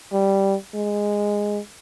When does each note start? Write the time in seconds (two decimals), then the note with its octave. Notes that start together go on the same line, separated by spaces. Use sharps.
0.13 G3
0.74 G#3